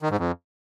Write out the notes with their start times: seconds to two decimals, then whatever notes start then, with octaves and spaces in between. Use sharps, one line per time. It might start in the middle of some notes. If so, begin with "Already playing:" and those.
0.02 D#3
0.10 G#2
0.18 F2